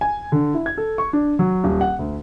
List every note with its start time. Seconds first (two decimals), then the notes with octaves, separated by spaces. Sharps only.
0.01 G#5
0.32 D3
0.54 E4
0.66 G#6
0.78 A4
0.98 C#6
1.13 D4
1.39 F#3
1.64 D#1
1.81 F#5
1.99 D2